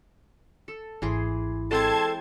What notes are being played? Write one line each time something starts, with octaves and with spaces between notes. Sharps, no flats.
A4
G#1 E3 G#4 C6
G#3 C4 A4 G5 A5 C6 G#6